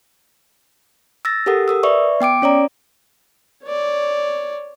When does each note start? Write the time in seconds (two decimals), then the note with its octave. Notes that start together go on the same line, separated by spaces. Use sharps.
1.25 E6 A6 A#6
1.46 G4 A4 A#4 F#5 D#6
1.68 A#4 D#6 E6
1.83 B4 D5 E5 C#6
2.20 B3 G5 D6 D7
2.42 C#4 C#5 D5 A#5
3.64 C#5 D5